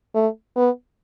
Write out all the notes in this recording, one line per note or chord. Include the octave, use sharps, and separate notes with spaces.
A3
B3